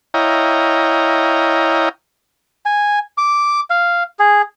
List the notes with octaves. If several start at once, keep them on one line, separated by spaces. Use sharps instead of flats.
E4 C#5 D#5 F5 G5 A#5
G#5
D6
F5
G#4